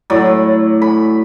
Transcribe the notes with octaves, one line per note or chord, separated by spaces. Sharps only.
A2 F#3 D5 B5
B5